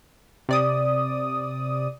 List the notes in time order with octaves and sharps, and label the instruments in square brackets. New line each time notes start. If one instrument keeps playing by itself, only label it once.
[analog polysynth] C3 D5 D#6